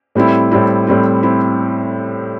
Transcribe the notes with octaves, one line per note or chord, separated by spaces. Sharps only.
A2 G3 C4 E4
A2 G3 C4 E4
A2 G3 C4 E4
C4 E4